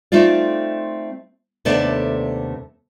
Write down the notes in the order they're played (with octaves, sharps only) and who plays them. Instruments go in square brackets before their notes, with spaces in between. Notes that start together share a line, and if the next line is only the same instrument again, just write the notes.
[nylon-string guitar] A3 C4 D#4 F4 D5
D#2 C3 A3 B3 D4 D5